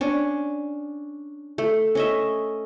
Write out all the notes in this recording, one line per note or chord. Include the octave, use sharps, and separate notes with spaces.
C#4 D4
A3
C#4 D#5 E5